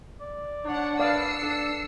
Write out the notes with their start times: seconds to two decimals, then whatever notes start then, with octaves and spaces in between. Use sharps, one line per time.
0.21 D5
0.65 D4 C#5 F#5
1.00 B4 D5 F5 D#6 E6 C7 C#7
1.42 D4 A4